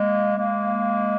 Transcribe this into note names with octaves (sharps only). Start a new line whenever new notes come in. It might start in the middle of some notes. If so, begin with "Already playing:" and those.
Already playing: G#3 A#3
G#3 A#3